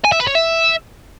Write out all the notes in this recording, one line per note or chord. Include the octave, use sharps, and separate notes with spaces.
G#5
E5
B4
C#5
E5